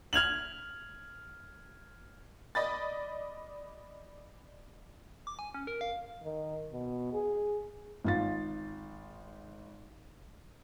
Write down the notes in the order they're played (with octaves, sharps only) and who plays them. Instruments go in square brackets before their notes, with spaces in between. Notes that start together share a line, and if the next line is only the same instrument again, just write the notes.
[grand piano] F6 G#6 F7 F#7
[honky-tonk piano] D5 D#5 B5 A6
[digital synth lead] D6
G#5
C#4
A#4
F5
[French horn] D#3
B2
G#4
[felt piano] G#1 F4 A6